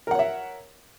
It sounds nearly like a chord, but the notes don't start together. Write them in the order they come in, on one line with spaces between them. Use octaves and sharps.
A#4 F#5 C#5 E5